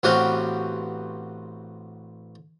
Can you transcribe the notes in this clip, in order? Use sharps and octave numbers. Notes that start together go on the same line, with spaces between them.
A1 B3 C4 F#4 G4 F5